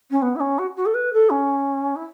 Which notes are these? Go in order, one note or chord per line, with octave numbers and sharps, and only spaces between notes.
C#4
B3
E4
C#4
F#4
F#4
A4
B4
A4
C#4
E4